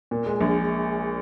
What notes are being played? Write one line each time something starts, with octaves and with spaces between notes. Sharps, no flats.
A#2
G#3
A#1